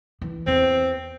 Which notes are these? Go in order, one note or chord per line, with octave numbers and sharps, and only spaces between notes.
E3
E2 C4